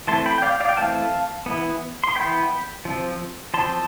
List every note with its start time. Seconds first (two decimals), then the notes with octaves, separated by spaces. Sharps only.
0.07 E3 A3 C4 A5 C6
0.26 G5 B5
0.38 G5
0.42 D5 F5
0.60 D5 F5
0.69 G5
0.77 E3 A3 C4 F5 A5
1.46 E3 B3
2.04 C6
2.15 E3 B3 G5 B5
2.85 F3 C4
3.54 F3 C4 A5 C6